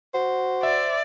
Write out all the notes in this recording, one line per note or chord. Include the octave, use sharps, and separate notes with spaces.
F#4 C5
D5 E5